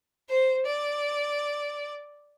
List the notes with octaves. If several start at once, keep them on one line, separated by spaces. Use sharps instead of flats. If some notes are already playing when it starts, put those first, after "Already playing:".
C5
D5